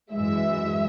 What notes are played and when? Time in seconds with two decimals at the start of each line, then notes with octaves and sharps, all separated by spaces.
0.11 F#2 E3 G#3 E5